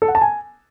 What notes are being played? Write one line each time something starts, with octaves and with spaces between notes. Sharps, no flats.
A4
F#5
A5
G#5